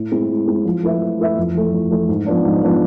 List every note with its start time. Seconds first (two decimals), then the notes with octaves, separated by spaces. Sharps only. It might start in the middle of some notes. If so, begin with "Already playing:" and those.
Already playing: A2
0.12 G#3 C4 E4
0.30 A2
0.47 G#3 C4 E4
0.65 F3
0.83 A3 E4 B4 E5
1.01 F3
1.19 A3 E4 B4 E5
1.37 F2
1.55 E3 A3
1.73 F2
1.91 E3 A3
2.09 G#2
2.27 F3 B3 D4
2.45 G#2
2.63 F3 B3 D4